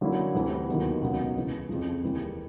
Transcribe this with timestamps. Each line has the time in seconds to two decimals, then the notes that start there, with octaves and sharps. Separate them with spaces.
0.01 D3 F#3 A#3 C#4 E4
0.35 D2 C3 E3 G3
0.68 D#2 D#3 F#3 B3
1.02 C#2 B2 F#3 B3
1.36 C#2 C#3 E3
1.69 F2 C#3 F3
2.03 D#2 C#3 E3 G3 C4